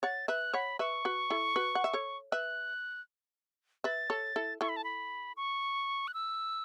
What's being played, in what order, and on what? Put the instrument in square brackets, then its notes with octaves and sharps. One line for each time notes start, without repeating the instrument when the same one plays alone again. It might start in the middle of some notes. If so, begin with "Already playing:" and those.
[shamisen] C#5 F#5 [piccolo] A6
[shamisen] B4 E5 [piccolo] F#6
[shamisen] C#5 F#5 [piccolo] B5
[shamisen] B4 E5 [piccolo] C#6
[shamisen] F#4 B4
E4 A4
F#4 B4
F#5
E5
A4 C#5
[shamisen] B4 E5 [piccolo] F#6
[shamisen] B4 E5 [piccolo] A6
[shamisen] A4 C#5
E4 A4
[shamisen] E4 A4 [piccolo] C#6
[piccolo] B5
A5
B5
C#6
F#6
E6